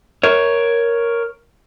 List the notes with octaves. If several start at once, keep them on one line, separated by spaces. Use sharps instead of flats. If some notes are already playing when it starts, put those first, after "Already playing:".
A#4 C#5